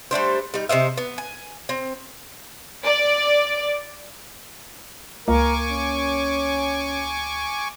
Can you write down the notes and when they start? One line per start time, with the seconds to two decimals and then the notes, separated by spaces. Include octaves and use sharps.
0.11 G3 A3 D4 C5
0.54 G3 D#4
0.69 C3 C5 D#5 E5
0.97 B3
1.18 G#5
1.69 C4
2.83 D5
5.28 C#2 A#3 A#4 F5 G#5 C#6 D6
5.71 C#4